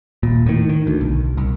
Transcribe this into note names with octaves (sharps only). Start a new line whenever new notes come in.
D#1 A#2
A2 D#3
D#3
D2
B1
C2